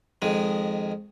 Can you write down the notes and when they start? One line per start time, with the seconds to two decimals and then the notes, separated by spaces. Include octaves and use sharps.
0.22 F2 D#3 G#3